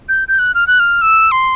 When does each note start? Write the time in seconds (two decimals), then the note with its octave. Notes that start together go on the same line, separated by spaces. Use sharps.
0.09 G6
0.28 G6
0.39 F#6
0.55 F6
0.67 F#6
0.80 F6
1.02 E6
1.32 C6